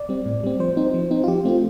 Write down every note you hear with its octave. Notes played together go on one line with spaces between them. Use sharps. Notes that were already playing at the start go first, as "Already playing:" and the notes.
Already playing: D5
G3 C4
A2
G3 C4
F3 C5
C4 D#4
F3
C4 D#4
F4
F3 G4
A3 C4 F4